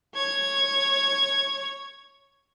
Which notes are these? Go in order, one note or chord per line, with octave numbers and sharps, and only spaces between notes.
C#5 G#6